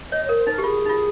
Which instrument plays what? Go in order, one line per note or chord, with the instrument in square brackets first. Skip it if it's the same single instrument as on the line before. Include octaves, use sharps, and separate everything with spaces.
[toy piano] C#5 [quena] D#5
[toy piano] A#4 [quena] C#5
[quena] C5
[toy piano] D#4 [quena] A#4
[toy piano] G4
[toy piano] F4 [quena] G#4
[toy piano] D#4
F4